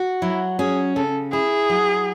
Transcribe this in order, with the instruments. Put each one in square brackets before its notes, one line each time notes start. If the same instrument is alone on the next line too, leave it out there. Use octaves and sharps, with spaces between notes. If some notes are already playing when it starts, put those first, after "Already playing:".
Already playing: [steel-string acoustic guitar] F#4
[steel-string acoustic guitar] F#3 [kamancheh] E4
[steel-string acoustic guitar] C#4 [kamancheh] G#4
[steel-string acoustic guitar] C#3 [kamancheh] A4
[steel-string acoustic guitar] E4 [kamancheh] G#4
[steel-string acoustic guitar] F#3